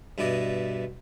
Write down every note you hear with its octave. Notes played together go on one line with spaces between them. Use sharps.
G2 B2 E4 D5 D#5